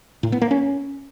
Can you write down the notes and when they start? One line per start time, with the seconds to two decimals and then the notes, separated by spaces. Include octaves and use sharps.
0.23 A2
0.32 B3
0.41 A#3
0.51 C#4